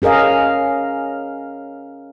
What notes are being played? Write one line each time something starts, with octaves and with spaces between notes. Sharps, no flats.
C#4 G#4 A#4 D#5 F5